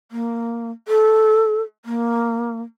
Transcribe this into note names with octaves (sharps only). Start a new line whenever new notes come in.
A#3
A4
A#3